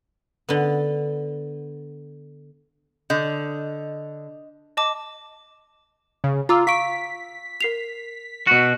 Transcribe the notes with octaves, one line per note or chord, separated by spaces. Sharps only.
D3 B3
D3 D#5 G6
D#5 A5 D6
C#3
F4 A#5 D6 E6
F5 C#6 B6 D7
A#4 C7 F7
B2 F#4